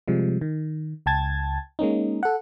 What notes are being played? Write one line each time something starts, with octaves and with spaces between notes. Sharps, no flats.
C3 F3 G3 G#3
D#3
C#2 G5 A5 G#6 A6
G#3 A#3 C#4 D#4
A4 F#5